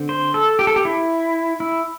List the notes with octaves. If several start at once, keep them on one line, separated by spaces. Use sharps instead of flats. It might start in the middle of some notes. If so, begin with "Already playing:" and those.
Already playing: D3 C4
C5
A4
G4
A4
G4
E4
E4